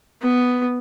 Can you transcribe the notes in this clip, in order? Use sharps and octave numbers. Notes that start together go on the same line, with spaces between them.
B3